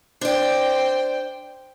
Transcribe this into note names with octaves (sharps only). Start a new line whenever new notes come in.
D4 C5 D5 G5